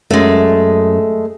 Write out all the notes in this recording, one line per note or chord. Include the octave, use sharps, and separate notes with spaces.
F#2 G#3 A3